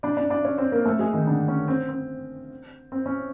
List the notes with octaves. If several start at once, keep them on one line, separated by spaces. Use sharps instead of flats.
D4 D5
D4 D5
D4 D5
C#4 C#5
C4 C5
A#3 A#4
A3 A4
G#3 G#4
D#3 D#4
D3 D4
C#4
C4
C4
C4
C#4